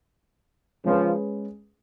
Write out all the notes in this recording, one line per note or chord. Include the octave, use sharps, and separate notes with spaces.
C#3 F3 G#3 C#4 G#4 B4